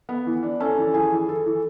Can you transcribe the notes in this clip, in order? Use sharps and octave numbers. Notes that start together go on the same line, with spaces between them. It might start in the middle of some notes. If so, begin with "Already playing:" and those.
B3
E3
D4
C#4 A4 A5
E3
E3 G#4 G#5
E3
E3 A4
E3